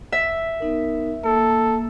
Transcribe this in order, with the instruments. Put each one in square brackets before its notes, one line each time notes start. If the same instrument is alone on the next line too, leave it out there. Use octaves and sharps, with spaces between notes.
[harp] E5
[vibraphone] B3 D#4 A#4
[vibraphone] A#3 [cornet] A4